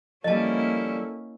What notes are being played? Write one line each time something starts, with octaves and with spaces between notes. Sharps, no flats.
F3 G3 A#3 C#4 E4 A4 D#5 A5